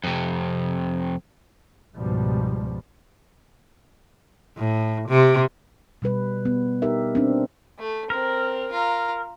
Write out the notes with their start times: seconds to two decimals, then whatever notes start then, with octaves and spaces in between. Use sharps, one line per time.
0.04 F2 C3
1.95 C#2 G#2 B2 F3 G3
4.57 A2
5.09 C3
6.02 B2 G3 B4
6.45 B3
6.82 D#4 G4 A#4 E5
7.15 C4 D4
7.78 A3
8.10 C4 A#4
8.72 F4 A#5